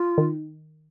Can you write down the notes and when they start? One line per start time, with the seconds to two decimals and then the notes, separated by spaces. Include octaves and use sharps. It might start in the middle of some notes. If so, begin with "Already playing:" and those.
Already playing: F4
0.18 D#3